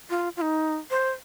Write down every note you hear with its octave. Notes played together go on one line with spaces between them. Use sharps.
F4
F4
D#4
C5